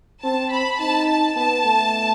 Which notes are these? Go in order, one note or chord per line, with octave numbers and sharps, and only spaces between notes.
C4 A5
B5
D#4 A5
A5
B3 A5
A3